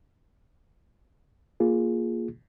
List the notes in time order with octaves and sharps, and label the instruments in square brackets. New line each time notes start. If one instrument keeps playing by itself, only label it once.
[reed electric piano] A#3 F4 G#4